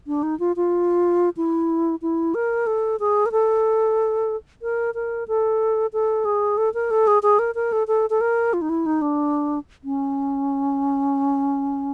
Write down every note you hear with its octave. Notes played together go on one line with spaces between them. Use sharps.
D4
D#4
F4
F4
E4
E4
A#4
A4
G#4
A#4
A4
A#4
A#4
A4
A4
G#4
A4
A#4
A4
G#4
G#4
A#4
A#4
A4
A4
A4
A#4
F4
D#4
E4
D#4
D4
C#4